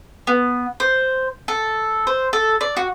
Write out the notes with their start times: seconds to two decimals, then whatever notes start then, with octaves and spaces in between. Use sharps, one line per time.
0.27 B3
0.80 C5
1.48 A4
2.07 C5
2.33 A4
2.61 D5
2.77 F#4